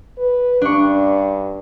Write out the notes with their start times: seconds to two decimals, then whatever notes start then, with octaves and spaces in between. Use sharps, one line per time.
0.18 B4
0.62 G2 D4 C#6